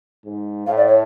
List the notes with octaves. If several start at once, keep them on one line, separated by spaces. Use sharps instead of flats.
G#2
A2 F5
D5
C#5